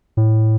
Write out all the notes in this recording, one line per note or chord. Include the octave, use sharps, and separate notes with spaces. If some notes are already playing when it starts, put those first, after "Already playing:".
A2